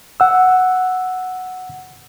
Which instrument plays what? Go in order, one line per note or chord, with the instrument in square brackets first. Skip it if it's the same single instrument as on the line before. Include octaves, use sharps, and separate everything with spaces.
[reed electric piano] F#5 E6